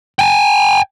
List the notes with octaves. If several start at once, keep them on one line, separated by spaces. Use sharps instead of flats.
G5 G#5